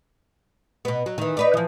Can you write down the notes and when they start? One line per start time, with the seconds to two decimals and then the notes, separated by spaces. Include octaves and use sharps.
0.85 B2 B3
1.06 F#3
1.18 D#3 E3
1.37 D#4 B4 D5
1.54 E3 F3